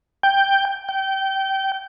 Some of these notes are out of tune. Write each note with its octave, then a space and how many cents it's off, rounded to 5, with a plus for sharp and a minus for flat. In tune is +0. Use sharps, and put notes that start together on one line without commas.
G5 +5
G5 -20